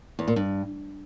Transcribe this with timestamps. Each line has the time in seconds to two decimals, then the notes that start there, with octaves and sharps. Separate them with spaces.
0.19 E2
0.28 A#2
0.36 G2